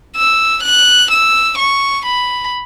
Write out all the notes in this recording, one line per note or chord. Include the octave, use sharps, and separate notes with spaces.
E6
F#6
E6
C#6
B5